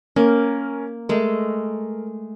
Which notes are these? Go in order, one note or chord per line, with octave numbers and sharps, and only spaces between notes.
A#3 C#4 A#4
G#3 A3 A#4